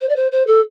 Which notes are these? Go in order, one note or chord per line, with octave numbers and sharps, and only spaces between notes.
C5
D5
C5
C5
A4